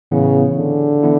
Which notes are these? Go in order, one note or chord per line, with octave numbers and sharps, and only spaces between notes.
A2 C#3 E3 B3 E4
D3
E3 B3 E4